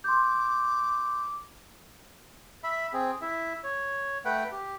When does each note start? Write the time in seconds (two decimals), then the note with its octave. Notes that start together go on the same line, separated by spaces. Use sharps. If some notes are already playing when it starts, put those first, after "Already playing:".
0.04 C6 D6 G6
2.64 E5 B5
2.93 C4 G#4
3.22 E4 E5
3.64 C#5
4.25 A3 B4 F#5 G5
4.52 G4